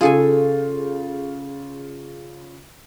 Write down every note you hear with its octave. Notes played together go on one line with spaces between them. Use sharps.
C#3 F4 G#4 A4 G#5